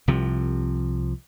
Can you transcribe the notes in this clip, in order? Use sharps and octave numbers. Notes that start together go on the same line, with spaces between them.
C2 C3 F3